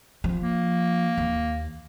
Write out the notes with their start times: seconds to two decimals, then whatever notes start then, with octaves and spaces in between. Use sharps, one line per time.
0.24 F3
0.40 A#3
1.18 D#2